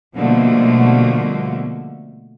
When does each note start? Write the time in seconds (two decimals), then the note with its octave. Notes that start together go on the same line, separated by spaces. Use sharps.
0.16 B2 D3 F3 G3 A3 A#3